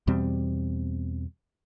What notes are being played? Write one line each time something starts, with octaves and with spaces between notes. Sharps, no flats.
E2 B2 G3 C4